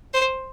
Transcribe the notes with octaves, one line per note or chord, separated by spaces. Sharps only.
C5